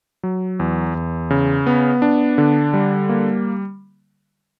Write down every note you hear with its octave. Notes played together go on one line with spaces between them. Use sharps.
F#3
E2
E2
C#3
B3
D4
D3
G3
A#3